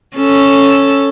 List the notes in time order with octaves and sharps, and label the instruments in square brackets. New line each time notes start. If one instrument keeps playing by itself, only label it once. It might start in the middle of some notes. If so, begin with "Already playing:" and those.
[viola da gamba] C#4 A4